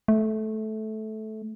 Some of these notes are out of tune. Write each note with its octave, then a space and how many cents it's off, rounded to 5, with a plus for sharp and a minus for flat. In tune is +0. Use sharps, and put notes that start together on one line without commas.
A3 -15